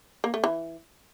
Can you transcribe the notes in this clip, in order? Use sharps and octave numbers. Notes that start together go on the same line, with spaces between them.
A#3
A3
E3